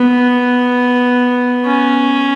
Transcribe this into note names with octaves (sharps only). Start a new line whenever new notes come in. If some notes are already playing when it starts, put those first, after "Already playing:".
Already playing: B3
C#4